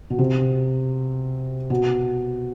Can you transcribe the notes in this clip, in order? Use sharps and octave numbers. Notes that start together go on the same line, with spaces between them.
B2
C3
B2